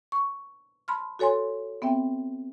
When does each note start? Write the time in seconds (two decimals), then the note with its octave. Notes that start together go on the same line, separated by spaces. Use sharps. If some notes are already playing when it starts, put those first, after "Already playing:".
0.12 C#6
0.88 A5 B5 C6 F6
1.19 F#4 A4 C#5 G#5 C6
1.82 B3 C4 E5 G5